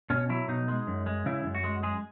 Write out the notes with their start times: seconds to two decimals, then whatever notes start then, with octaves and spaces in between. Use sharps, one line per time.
0.10 B2 C#4
0.29 F#3 E4
0.48 B2 D#4
0.68 G#3
0.87 F#2
1.06 G#3
1.26 C#3 E4
1.44 F#2
1.55 F#4
1.64 G#3
1.83 G#3 G#4